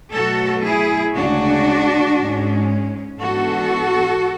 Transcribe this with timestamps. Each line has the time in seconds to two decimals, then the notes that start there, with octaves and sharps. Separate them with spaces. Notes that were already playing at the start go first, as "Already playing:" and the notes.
0.13 B2 F#3 A3 F#4 A4
0.64 E4 G#4
1.15 D2 C#3 G#3 D4 F#4
2.18 G#2 G#3 C#4
3.20 G#2 E3 B3 D4 F#4 A4